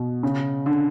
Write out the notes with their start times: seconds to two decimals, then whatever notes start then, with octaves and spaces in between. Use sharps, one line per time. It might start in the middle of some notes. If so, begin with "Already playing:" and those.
Already playing: B2
0.23 C#3
0.66 D3